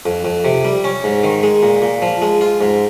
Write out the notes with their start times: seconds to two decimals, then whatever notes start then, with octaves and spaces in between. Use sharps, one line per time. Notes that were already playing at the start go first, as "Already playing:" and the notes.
0.06 F2
0.25 F2
0.45 C3
0.65 G3
0.84 C#4
1.04 G#2
1.23 D#3
1.43 G#3
1.63 A#2
1.82 A#2
2.02 F3
2.22 G#3
2.41 F4
2.61 G#2